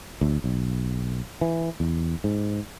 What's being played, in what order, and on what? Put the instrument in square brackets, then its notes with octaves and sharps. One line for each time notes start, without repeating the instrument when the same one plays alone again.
[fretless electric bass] D2
B1
E3
E2
G#2